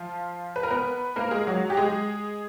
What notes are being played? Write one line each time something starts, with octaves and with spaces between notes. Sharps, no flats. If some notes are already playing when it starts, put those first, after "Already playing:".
Already playing: F3 F4
B4
A#4
B3 B4
A#3 A#4
G#3 G#4
F#3 F#4
G4
G#3 G#4